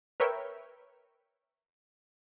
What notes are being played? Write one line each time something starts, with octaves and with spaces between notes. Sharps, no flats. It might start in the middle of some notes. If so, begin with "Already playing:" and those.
A#4 B4 C#5 E5 G5